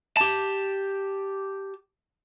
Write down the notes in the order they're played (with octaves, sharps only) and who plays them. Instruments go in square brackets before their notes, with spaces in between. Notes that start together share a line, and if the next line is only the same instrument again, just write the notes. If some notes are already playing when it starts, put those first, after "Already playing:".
[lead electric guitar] G4 A5